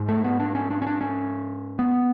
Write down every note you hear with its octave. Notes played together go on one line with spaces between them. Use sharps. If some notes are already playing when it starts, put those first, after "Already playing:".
Already playing: G#2
A3
B3
D4
C#4
D4
C#4
D4
C#4
B3